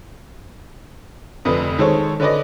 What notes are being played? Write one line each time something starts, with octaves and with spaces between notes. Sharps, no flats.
F1 F2 D3 B4 D#6
D#3 G#3 A4 C5 C#5
D3 C#4 B4 D5 D#5